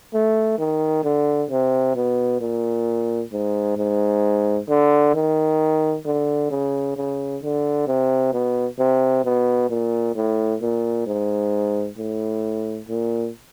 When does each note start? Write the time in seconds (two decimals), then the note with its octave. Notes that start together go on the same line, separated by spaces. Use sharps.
0.14 A3
0.58 D#3
1.04 D3
1.50 C3
1.95 B2
2.41 A#2
3.32 G#2
3.77 G#2
4.69 D3
5.15 D#3
6.05 D3
6.51 C#3
6.97 C#3
7.42 D3
7.87 C3
8.33 B2
8.79 C3
9.24 B2
9.70 A#2
10.15 A2
10.61 A#2
11.06 G#2
11.97 A2
12.89 A#2